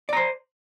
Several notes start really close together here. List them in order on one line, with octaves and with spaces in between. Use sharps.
D5 A#5 C5